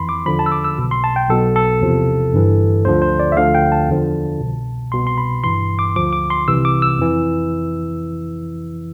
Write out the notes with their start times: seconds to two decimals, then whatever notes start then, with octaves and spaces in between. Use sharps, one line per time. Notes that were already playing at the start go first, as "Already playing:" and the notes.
Already playing: F2 E3 B5 C6
0.09 D6
0.26 E2 D3 F3 B5
0.39 A5
0.46 E6
0.52 D6
0.64 E6
0.78 B1 B2
0.91 C6
1.04 A5
1.16 G5
1.29 B1 B2 A4
1.56 A4
1.81 E2 C3 F3
2.33 G1 G2 E3
2.85 D2 D3 F3 C5
3.02 C5
3.19 D5
3.32 E5
3.37 D2 D3 F3 F5
3.55 G5
3.72 A5
3.88 E2 D3 F3
4.40 C2 B2
4.92 C2 B2 C6
5.07 C6
5.18 B5
5.44 G1 G2 E3 C6
5.79 D6
5.96 D2 D3 F3 D6
6.13 D6
6.30 C6
6.48 C2 C3 E3 E6
6.65 D6
6.82 E6
6.99 F2 E3